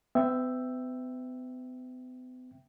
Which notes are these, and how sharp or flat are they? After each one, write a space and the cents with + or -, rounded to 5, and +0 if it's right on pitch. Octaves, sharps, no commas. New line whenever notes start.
B3 +45 E5 +5 G5 +0